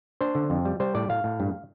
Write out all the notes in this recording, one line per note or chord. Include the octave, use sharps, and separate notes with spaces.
D4 C5
D3
F2
G3
G3 C5
A2 D5
A2 F5
A2
G2